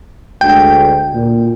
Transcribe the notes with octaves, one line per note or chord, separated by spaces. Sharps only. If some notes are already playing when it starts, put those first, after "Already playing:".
D2 G#3 G5
A#2